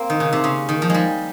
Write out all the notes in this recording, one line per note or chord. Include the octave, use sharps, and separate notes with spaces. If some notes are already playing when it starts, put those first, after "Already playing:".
Already playing: A#3 C4
D#3
C#3
C3
C#3
D#3
F3
G3 G#3